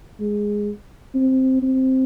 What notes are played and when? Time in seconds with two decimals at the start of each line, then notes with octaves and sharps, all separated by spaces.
0.20 G#3
1.15 C4
1.62 C4